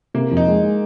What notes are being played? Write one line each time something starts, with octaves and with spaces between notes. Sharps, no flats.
C3 A#3
F2
D#4
G#3
G#3